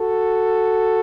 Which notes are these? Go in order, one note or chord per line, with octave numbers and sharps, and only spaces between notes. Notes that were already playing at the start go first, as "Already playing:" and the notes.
Already playing: F#4 A4